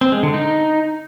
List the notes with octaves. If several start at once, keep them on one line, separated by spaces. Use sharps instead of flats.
C4
G#3
D3
D#4